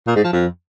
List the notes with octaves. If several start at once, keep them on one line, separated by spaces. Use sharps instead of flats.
A#2
G#2
F3
F2